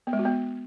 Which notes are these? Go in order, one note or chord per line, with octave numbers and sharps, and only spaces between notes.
B3
G#3
F#4
B3